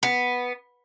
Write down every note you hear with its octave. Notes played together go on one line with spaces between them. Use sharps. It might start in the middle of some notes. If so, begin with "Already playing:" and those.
B3